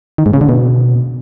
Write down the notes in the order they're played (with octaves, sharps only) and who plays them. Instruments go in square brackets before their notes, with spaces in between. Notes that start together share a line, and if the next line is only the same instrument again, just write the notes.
[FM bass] D#3
G#2
C#3
D3
B2